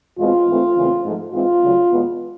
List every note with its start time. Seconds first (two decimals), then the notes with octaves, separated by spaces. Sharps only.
0.18 E2 B2 G#3 C4 F4
0.47 G#2 E3 A3 C4
0.77 E2 C#3 E3 A3 C4
1.05 G#2 F3 A3
1.33 G#2 E3 G#3 C4 F4
1.63 D2 C#3 F#3
1.91 E2 B2 G#3 B3